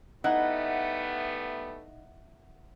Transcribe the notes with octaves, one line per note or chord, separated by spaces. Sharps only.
G3 A3 B3 D#4 E4 F#5